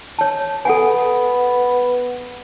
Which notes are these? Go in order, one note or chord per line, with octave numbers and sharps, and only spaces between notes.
C#5 A5
B3 A4 F#5 G#5